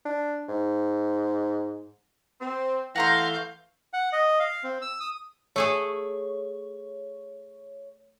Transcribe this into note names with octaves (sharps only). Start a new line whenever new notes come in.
D4
G#2
C4
E3 A3 F5 F#5 A#5 C6 G6 A#6
F#5
D#5
F5
C4
E6
D#6
A3 G#4 A4 C#5